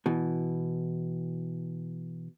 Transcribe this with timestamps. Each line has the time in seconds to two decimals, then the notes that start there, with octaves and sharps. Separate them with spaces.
0.06 B2 E3